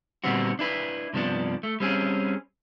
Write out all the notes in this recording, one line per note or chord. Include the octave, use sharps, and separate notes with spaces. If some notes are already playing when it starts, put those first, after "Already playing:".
A#2 D3 G3 B3 C4 F#4
D4 E4 B4
G2 C3 F3 B3 D4
A3
G3 C4 C#4 G#4